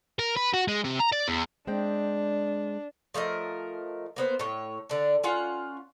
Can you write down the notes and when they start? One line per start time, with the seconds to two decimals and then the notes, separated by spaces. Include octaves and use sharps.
0.19 A#4
0.37 B4
0.54 F#4
0.68 G#3
0.85 C3
1.00 A#5
1.12 D5
1.28 E2
1.67 G#3 C4 D4 G5
3.14 F3 A3 A#4 D#5
4.16 A#3 B3 C5
4.39 A2 C#5
4.89 D3 D4
5.24 C#4 F4 F#5